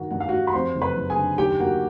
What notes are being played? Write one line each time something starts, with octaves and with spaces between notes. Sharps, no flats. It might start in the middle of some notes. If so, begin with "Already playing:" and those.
Already playing: G2 D#3 F#4
G2 F#5
F5
G3 F#4 F#5
B5
F2 C5 C6
F#1
B4 B5
F#1
G#4 G#5
D3
D#2 G4 G5
A#3 F#4 F#5